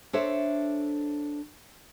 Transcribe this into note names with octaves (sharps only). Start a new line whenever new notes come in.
D4 A4 C5 C#5 E5